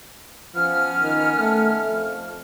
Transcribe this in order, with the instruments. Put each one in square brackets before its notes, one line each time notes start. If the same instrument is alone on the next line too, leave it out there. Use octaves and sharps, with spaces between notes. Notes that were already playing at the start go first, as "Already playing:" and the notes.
[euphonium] F3 [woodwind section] B3 C#4 F6
[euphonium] D#3
A3
F2